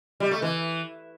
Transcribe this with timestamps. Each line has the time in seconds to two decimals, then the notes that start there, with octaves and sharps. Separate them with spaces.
0.20 G3
0.31 A3
0.42 E3